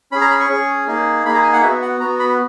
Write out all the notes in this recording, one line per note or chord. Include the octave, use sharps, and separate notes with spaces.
C#4 G#4 B5
A#5
B5
C#6
C#4 G#4
A#3 D#4 G#4
A#3 D#4 G#4 B5
A#5
G#5
F#5
B3 F#4 E5
F#5
B3 F#4 A#5
B5